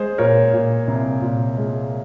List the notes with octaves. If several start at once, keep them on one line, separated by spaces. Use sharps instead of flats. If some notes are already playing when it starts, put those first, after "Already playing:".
Already playing: G#3 G#4 C5
A#2 A#4 C#5
A#2
C2
A#2
G#3